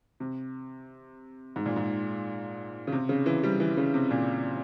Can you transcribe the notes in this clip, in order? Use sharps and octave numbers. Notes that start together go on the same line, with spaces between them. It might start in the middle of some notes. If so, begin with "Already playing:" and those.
C3
G#2
A#2
G#2
C#3
C3
C#3
E3
G3
E3
C#3
C3
A#2